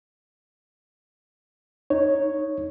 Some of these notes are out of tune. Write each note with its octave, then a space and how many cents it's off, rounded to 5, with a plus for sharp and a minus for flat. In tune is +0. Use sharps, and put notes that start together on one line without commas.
D#4 +0 C#5 +0